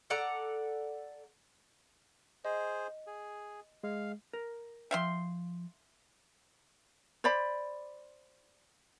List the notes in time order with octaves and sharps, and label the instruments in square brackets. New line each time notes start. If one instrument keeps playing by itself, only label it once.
[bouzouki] A4 D5 F#5 A#5
[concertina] G#4 C5 [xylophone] D#5
[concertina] G#4
[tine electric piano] G#3 [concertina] F5
[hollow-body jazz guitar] A#4
[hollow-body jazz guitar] F3 G5 [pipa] E5 F5 C6
[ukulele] C5 D5 B5